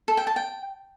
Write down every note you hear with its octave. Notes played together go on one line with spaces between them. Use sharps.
A4
G5
A5
G5